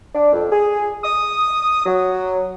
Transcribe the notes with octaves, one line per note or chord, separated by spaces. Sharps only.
D4
F2
G#4
D#6
F#3